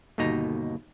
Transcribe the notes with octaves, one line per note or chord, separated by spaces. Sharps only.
G1 D#2 B2 D#4 A#5